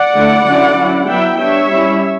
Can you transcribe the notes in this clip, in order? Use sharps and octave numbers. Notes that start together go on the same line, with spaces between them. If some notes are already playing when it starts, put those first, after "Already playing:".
Already playing: D5 F#5
D3 A3 E4
D3 F#3 C#4 E4
F#3 C#4 E4
F#3 B3 E4 E5 G5
G3 D4 C#5 E5
G3 C#4 E4